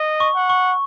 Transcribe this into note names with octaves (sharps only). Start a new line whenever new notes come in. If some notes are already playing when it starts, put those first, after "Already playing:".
Already playing: D#5
C#6
F#5
C#6